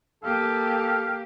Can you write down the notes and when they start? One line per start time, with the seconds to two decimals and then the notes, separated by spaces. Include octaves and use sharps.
0.23 A#3 G4 A4 F5